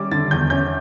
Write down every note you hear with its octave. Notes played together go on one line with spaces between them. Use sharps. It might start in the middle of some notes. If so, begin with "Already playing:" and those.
Already playing: G3 C#4 D6
D3 A6
E2 G6
C#4 G6